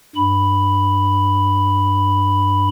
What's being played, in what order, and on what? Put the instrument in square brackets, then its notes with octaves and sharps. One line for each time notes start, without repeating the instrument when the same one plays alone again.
[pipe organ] G2 B5